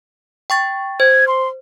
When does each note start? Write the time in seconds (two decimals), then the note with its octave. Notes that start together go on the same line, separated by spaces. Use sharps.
0.50 G5 C#6 A6
1.00 C5 G#6
1.28 C6